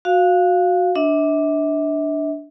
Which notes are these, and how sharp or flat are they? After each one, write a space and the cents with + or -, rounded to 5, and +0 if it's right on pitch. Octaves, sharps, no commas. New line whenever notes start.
F#4 -15 F5 +0
D4 +0 E5 -40